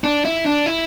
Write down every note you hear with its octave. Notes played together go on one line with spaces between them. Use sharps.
D4
E4
D4
E4